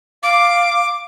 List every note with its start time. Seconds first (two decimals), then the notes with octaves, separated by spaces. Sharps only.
0.23 F5 D6